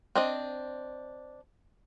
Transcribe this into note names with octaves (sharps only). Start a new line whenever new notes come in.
C4 D4 D#5